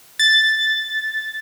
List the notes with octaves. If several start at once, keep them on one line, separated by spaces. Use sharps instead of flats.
A6